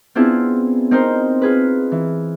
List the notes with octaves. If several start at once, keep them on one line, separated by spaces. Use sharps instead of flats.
B3 C4 D4 E4 F4 G#4
C4 D#4 A#4 C5
F4 G#4 B4
E3